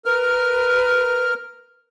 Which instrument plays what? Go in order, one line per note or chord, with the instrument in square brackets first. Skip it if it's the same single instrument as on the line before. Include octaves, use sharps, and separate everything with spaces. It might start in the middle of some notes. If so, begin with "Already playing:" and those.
[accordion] A#4 F6 [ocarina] B4